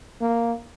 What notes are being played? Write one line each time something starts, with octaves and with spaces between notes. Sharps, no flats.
A#3